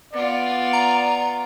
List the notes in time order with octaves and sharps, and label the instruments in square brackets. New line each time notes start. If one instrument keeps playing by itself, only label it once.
[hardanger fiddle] B3 F4 [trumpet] D5
[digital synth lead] A#5